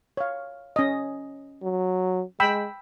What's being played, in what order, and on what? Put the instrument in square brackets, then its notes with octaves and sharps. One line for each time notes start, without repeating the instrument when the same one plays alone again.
[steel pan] C#5 F5
C#4 D#5
[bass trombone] F#3
[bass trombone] G#3 [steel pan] G5 B5 E6